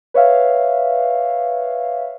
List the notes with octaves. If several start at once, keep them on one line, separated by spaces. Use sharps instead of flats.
B4 C#5 E5 F5